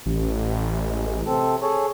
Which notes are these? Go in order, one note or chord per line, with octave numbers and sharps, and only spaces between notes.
A1
G#3
C3 C4 A4
G#4 A4 C#5